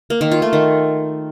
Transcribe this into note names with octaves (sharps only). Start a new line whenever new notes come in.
A#3
D#3
F4
A3
D#3